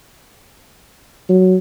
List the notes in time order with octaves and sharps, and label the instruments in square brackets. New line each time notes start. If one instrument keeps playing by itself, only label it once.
[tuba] F#3